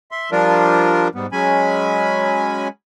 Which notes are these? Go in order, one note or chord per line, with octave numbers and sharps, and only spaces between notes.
E5 C6
F3 G3 D4 F4 A#4
G#2 G3 B3
F#3 G#3 C#4 G#5 B5